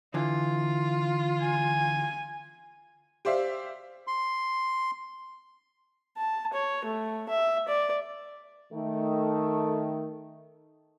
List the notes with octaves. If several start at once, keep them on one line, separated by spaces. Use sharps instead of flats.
D3 E3 F4
G#5
G4 C5 D5 E5 F5
C6
A5
C#5
A3
E5
D5
D#3 A3